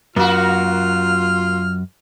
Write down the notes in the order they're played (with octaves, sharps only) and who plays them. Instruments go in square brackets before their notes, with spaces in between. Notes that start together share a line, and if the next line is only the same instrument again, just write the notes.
[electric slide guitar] F#2 F#3 [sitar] A#3 F#4 [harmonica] F4 F6